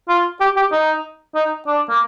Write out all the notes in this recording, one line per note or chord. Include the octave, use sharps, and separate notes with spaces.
F4
G4
G4
D#4
D#4
D4
A#3